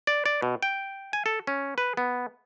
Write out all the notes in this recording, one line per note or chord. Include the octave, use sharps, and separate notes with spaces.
D5
D5
B2
G5
G#5
A4
C#4
B4
B3